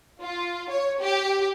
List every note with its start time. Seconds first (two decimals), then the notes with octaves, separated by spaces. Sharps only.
0.21 F4
0.70 C#5
1.02 G4